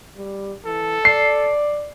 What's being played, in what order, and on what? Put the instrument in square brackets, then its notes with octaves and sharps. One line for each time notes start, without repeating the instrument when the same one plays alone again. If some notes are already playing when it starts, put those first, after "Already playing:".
[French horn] G3
[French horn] E3 [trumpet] A4
[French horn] D5 [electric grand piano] C7